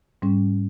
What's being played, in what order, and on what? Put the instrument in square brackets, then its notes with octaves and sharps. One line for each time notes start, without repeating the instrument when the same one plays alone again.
[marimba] G#2 G3 C#4